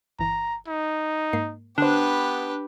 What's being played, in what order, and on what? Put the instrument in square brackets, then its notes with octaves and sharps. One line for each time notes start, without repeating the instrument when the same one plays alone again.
[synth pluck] G1 E3 [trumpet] A#5
[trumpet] D#4
[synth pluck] G#2 A#3 C7
[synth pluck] D3 C5 [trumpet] B3 [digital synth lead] D4 [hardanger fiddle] G4 B4